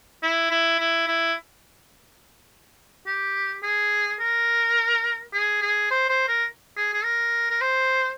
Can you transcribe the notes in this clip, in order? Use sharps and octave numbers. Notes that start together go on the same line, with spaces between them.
E4
E4
E4
E4
G4
G#4
A#4
G#4
G#4
C5
C5
A#4
G#4
G#4
A#4
A#4
C5